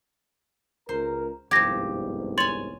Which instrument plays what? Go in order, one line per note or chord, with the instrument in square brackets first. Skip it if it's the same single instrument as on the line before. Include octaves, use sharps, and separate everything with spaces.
[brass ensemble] C#2 A#4 A#5 [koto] C5
[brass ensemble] G1 C2 G#2 [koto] F3 G4 [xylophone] G#6 A#6
[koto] C#5 G#5 [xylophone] C6 A6 F#7